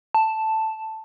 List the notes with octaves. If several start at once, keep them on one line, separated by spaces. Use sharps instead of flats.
A5